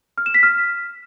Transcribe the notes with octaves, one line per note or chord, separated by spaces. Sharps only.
F6
E7
B6
F6